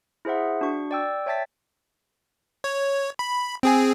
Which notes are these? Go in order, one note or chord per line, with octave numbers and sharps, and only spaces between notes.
E4 G#4 C5 E5 F#5
D4 F#4 C#6
D5 G5 E6
C#5 E5 G5 A5 A6 B6
C#5
B5
C4 G#4 G#5